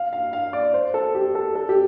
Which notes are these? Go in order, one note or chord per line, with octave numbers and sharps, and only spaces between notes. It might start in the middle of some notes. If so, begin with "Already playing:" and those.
Already playing: F5
F5
F5
D5
C5
A4
G4
A4
A4
G4